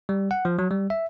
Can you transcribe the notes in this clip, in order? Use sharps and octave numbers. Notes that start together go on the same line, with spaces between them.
G3
F#5
F3
F#3
G3
E5